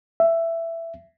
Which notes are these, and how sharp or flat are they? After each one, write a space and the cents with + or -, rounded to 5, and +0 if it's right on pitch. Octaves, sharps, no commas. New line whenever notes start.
E5 +15